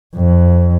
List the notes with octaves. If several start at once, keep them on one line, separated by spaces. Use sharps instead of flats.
F2